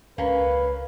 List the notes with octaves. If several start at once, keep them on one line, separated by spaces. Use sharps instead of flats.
C#2 A#3 C#4 B4